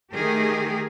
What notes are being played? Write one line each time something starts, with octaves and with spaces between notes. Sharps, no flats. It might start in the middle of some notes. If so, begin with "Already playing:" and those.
D#3 A3 G4 G#4 A#4